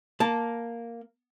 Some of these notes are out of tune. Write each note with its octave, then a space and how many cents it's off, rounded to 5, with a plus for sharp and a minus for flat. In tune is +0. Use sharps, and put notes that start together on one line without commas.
A#3 +0 A5 +0